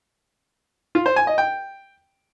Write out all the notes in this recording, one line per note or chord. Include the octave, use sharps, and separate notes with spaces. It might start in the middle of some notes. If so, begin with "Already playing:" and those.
F4
C5
G#5
D#5
G5